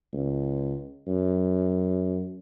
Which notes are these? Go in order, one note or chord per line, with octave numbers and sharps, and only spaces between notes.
C#2
F#2